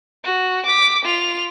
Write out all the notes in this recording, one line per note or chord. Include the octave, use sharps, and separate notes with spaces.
F#4
D6 B6
F4 F7